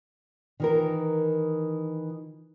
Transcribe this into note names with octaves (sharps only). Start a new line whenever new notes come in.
D#3 E3 A#4